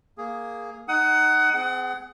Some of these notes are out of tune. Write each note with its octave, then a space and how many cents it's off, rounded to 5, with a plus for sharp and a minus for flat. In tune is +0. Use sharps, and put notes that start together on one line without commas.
A#3 +0 G#4 +0
D#4 +0 F#5 +20 D#6 +20
C4 -35 G#4 +0 F#5 +30